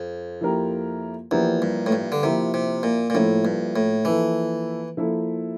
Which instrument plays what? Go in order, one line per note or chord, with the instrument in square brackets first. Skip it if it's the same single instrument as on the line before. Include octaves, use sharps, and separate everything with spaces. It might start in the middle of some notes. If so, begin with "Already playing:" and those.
Already playing: [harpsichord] F2
[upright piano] F3 A#3 E4 G4 A#4
[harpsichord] E2 [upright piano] F3 A#3 E4 G4 A#4
[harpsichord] G2
A2
G2
D3
[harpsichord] C3 [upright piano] F3 A#3 E4 G4 A#4
[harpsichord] C3
A#2
A#2
[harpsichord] A2 [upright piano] F3 A#3 E4 A4
[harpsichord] G2
A2
[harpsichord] E3 [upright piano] F3 A#3 E4 A4
[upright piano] F3 A#3 E4 A4